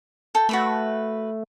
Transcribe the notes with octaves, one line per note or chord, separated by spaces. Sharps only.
A4 G5
A3 F#4 B4 B5